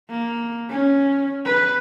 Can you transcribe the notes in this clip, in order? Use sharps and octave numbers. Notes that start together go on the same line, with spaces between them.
A#3
C#4
B4